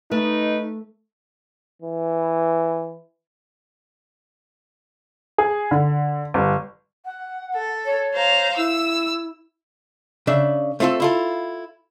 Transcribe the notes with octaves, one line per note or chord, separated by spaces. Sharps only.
A3 D#4 B4
E3
G#4
D3
G1
F#5
A4
C#5
C5 F5 A#5
E4 E6
C#3 D4 E5
A3 C4 F4 G#4 A4
E4 F4 A4